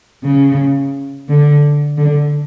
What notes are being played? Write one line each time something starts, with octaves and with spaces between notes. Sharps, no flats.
C#3
D3
D3